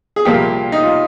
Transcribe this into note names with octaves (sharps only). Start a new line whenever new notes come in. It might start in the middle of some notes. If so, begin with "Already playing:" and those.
G#4
C2 A#2 F3 A#3 G4
D#4
F4